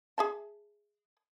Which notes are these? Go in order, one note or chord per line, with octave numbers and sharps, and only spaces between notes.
G#4 E5 A5